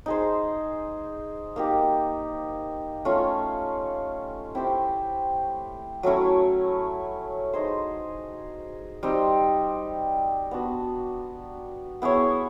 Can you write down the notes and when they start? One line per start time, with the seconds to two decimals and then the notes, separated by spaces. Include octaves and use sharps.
0.06 D#4 G#4 C5
1.56 A#3 D#4 G4
3.05 A3 C#4 F4
4.55 C4 E4 G4 C5
6.03 F#3 A3 C#4 E4
7.53 D#4 G#4 C5
9.03 G3 C4 D#4
10.51 B3 D4 F#4
12.02 B3 E4 G#4 C#5